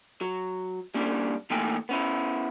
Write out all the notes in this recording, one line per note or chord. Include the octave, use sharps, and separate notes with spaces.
F#3
G3 A#3 C#4 D4
E3 A3 A#3 D#4 G5 G#5
B3 C#4 E4